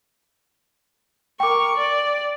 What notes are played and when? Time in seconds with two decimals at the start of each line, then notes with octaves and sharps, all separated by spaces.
1.40 A#4 G5 C#6 D6
1.77 D5